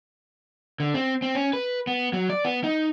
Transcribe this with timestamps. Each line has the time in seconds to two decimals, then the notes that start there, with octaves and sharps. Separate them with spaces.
0.80 D3
0.94 C4
1.22 C4
1.35 C#4
1.53 B4
1.87 B3
2.13 F#3
2.30 D5
2.45 B3
2.64 D#4